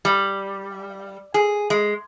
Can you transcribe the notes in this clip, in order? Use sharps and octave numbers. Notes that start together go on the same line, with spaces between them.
G3
G#4
G#3